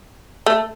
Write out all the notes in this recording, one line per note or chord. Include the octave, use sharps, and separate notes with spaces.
A3